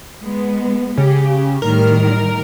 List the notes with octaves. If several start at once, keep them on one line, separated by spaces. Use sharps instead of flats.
G#3 B3
C#3 G4
A2 D#3 G3 A#4